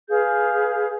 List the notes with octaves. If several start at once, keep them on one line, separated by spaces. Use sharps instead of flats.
G#4 B4 F5 G6